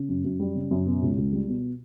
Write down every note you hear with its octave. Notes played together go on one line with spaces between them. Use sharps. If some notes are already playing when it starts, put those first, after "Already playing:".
Already playing: C#3
F#2
F#2
G3
C#3
F#2
B2
C#2
C#2
G3
B2